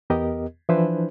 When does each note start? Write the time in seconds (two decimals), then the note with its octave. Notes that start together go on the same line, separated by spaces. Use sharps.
0.10 E2 B3 G4 A#4 D#5
0.69 E3 F3 D4 E4 B4 C5